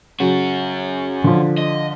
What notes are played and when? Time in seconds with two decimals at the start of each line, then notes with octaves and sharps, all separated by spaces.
0.20 C#3 F#3 C#4 F#4
1.24 D3 F3
1.58 D#5